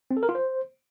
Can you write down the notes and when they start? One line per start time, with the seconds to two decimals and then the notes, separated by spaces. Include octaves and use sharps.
0.11 C4
0.17 A4
0.23 A#4
0.29 F4
0.35 C5